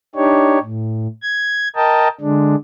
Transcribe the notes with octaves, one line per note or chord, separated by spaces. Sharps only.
D4 D#4 G4 C#5
A2
G#6
A#4 D#5 G5 A5
D3 G#3 D4